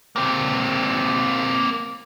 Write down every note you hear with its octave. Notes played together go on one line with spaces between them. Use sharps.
A#3 C4